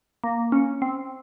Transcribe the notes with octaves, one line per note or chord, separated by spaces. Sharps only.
A#3
C#4
C4